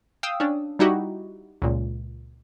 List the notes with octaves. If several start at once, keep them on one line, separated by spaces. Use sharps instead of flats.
F5 G5 D#6 E6
C#4 D4
G3 D#4 E4 F#4 G4
C#2 A#2